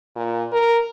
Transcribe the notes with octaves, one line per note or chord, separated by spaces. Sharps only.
A#2
A#4